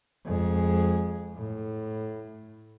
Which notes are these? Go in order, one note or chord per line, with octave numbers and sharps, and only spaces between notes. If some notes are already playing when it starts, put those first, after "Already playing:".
F2 G#3
A2